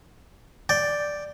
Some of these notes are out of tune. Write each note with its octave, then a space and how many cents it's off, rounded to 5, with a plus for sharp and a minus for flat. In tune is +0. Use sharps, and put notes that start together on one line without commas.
D5 +0 G5 +0